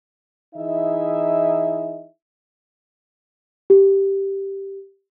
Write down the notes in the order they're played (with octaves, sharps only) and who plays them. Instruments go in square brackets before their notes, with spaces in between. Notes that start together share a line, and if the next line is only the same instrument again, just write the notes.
[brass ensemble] E3 D#4 E4 G#4 D#5 E5
[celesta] G4